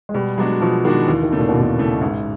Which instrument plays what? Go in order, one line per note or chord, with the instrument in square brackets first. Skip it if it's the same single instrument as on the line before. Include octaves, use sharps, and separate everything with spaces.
[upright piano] G#3
[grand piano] B2 [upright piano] G3
[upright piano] F#3 [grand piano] G#3 B3 D4 F#4
[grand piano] B2 [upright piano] F3
[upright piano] D#3 [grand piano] G#3 B3 D4 F#4
[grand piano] D#2 [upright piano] E3
[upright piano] D#3
[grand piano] C#3 E3 A3
[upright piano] A#2
B2
[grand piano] D#2
[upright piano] A#2
[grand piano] C#3 E3 A3
[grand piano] A1 [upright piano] G#2